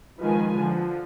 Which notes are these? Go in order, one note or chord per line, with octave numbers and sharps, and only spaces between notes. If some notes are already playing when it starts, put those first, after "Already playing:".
D#3 F3 G#3 F4 B4 G#5
D3 F3